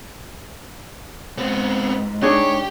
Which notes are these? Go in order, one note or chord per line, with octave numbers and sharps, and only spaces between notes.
G#2 B3 C4
D4 D#4 G4 G#4 C#5